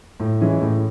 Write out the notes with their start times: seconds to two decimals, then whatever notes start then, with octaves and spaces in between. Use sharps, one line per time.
0.20 A2
0.40 E3 G#3 C#4
0.62 A2